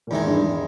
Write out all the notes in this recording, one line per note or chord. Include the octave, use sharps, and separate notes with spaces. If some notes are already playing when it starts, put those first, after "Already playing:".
A#2
E2 G#2 D#3 G#3
G2